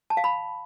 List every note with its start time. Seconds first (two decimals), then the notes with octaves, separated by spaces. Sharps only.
0.10 A5
0.17 F5
0.24 B5